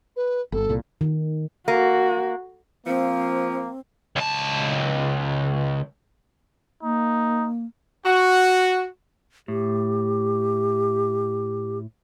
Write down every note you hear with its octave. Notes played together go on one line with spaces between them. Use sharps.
B4
G1 A4
C2 A#2
D#3
A#3 F#4
F3 A#3 C4
C#2 A5
A#3 D#4
F#4
A2 G4